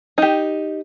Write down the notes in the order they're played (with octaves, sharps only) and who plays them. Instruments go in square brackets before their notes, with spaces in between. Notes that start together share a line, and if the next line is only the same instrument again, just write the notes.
[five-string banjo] D#4 G4